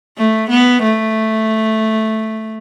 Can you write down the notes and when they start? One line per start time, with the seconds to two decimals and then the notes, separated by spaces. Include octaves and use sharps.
0.18 A3
0.50 B3
0.82 A3